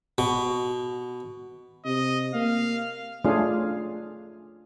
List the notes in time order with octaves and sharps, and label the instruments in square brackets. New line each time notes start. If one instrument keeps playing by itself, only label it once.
[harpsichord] B2
[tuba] C3 [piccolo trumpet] D#5
[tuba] A#3 [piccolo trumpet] F5
[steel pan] A3 C#4 D4 F4 G#4 F5